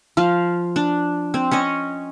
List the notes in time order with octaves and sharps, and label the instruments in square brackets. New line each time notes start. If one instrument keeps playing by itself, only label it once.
[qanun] F3 F5
D4
C4
C#4 C#5 D#5